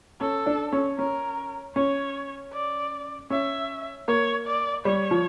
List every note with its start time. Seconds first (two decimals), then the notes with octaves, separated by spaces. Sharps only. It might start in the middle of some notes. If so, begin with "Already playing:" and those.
0.20 C#4 A4
0.46 D4
0.73 C#4
0.98 C#4 A#4
1.76 C#4 C#5
2.53 D5
3.30 C#4 E5
4.08 A#3 C#5
4.47 D5
4.85 G3 C#5
5.11 F3